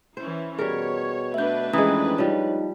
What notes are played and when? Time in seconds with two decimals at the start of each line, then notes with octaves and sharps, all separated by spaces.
0.17 E3 C#4 E4 C5
0.59 B2 G3 G#4 A#4 C#5
1.34 A3 D4 B4 E5 G6
1.73 F2 E3 G#3 C#4 A#5 D#6
2.18 F3 G3 D#4 C#5